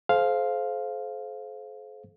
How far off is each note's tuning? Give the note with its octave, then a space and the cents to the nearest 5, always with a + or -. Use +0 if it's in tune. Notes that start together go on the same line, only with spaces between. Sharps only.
A4 -45 C5 +0 F5 +0